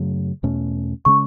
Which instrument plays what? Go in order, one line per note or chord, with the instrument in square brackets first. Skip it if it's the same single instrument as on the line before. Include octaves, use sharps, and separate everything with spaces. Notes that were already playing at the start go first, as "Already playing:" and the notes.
Already playing: [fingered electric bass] F#2 C#3 F#3 A3
E2 B2 A3 C#4
[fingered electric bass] C#3 G#3 C#4 [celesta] C#6